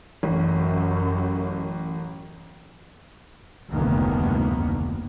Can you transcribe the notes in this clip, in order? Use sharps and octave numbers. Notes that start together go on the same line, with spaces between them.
A1 F#2
F1 D2 G2 D#3 A#3 B3